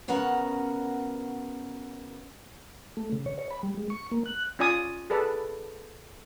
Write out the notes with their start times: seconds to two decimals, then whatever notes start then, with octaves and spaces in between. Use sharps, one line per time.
0.08 C#3 B3 C#4 F#4 A#4 F#5
2.97 A3
3.12 C#3
3.26 C#5
3.39 C#5
3.51 B5
3.63 G3
3.77 G#3
3.90 C#6
4.11 A#3
4.26 F#6
4.59 C#4 F4 D5 G#5 D#6
5.10 G#4 A4 B4 D5